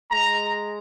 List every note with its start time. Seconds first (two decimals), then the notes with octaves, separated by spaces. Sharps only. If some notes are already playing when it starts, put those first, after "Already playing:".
0.11 G#3 A#5